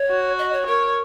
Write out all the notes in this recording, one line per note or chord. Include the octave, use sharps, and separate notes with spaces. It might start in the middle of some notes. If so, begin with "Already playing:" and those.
Already playing: C#5
F#4
D#5
C#5
A#4 C#5